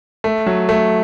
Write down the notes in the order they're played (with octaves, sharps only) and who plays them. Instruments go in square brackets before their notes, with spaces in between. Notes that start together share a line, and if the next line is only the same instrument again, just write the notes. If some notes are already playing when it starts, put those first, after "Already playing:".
[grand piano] A3
F#3
A3